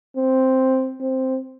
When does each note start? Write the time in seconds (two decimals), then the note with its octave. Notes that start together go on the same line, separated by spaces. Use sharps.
0.17 C4
1.00 C4